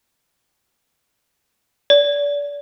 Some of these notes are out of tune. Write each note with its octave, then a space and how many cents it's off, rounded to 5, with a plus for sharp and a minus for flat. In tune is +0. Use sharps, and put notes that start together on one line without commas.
D5 -30